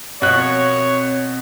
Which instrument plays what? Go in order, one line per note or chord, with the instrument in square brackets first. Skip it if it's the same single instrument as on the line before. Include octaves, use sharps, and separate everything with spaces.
[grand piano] B2 F#6 [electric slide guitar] C4 F5 G5 [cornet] C#5